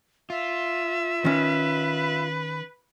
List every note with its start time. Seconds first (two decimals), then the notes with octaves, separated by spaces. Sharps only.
0.30 F4 E5
1.25 D#3 C#4 B4